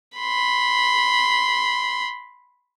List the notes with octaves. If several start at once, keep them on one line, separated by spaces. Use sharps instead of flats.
B5 C6